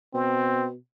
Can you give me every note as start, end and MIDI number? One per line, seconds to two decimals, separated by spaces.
0.14 0.76 47
0.14 0.68 60